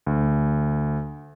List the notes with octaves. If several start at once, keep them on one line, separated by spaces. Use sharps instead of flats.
D2